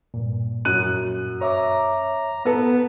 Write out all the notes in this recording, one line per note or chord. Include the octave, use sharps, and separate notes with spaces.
G2 A#2
F#2 F#6 D#7
C#5 E5 A#5 D6
B3 A4 B4 F#5